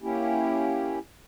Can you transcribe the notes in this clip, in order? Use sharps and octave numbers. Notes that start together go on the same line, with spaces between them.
A#3 C#4 E4 G4